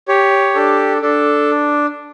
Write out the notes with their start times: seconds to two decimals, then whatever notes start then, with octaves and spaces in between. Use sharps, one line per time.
0.08 G4 C#5
0.55 D4 A4
1.02 D4 A4